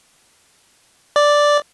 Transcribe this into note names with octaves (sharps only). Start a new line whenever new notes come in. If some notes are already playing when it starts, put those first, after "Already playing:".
D5